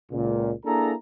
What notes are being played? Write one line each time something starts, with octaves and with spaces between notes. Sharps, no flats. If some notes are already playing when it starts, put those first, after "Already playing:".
C#2 A#2
A#3 D4 E4 G#4 A4 A#5